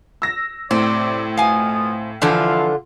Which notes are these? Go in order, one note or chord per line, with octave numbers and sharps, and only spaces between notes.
E6 A#6
A2 C3 C4 D5
B2 F4 F5 G#5 D#6
D3 E3 F3 D4 E4 F4 F5